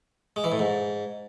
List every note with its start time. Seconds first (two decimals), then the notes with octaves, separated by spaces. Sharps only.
0.36 G#3
0.44 E3
0.52 A2
0.59 G#2